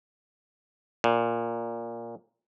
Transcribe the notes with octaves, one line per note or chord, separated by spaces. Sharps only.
A#2